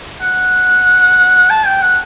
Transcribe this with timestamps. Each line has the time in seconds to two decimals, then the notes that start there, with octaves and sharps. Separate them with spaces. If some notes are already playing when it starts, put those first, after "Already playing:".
0.21 F#5
1.50 A5
1.66 G5
1.82 F#5